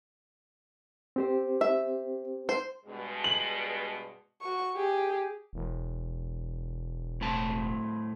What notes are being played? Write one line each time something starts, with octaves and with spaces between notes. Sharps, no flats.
C4 G4 C5
E5
C5
G2 B2 G#3
F#7
F#4 C#6
G4 G#4
E1
A2 C4 A5